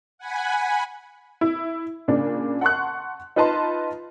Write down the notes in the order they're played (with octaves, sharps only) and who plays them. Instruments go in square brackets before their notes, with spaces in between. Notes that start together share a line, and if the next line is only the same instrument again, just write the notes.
[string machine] F#5 G#5 B5
[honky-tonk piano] E4
A#2 C#3 D4
F#5 A5 C6 C#6 F#6
D#4 F4 B4 D#5 A5 C6